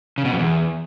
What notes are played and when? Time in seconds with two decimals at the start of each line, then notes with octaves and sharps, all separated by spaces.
0.18 C#3
0.25 B2
0.32 F2
0.39 E2